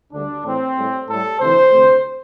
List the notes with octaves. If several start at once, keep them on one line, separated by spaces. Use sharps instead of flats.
D2 D3 G3 D4
A2 E3 A3 C4
A2 G3
A2 G3 A4
D2 C3 E3 C5
D2 C3 A3